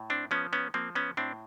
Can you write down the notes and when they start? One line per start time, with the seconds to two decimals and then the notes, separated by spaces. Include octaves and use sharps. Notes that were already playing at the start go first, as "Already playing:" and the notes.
Already playing: A2
0.10 C4 D4
0.31 F3 B3 C#4
0.53 B3 C#4
0.74 F3 A#3 C4
0.95 B3 C#4
1.17 A2 C4 D4